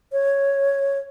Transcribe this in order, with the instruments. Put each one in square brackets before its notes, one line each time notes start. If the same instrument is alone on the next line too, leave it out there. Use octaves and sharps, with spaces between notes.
[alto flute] C#5